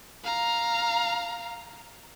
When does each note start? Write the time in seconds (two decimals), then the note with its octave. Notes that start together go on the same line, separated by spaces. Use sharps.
0.24 F5 A#5